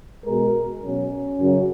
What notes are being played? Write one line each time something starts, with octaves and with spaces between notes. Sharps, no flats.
B2 G#3 A#4
B2 F#3 C#4
F#2 C#3 F#3